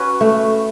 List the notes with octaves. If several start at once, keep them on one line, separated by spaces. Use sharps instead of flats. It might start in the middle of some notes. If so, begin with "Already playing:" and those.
Already playing: C#4 F#4 B4
A3